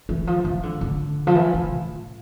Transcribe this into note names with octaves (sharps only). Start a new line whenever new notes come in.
E3
F3
E3
D3
D3
F3
E3
E3
A2